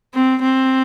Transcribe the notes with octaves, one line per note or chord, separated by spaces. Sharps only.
C4
C4